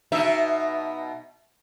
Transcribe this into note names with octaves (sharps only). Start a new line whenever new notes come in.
B2 D#4 E5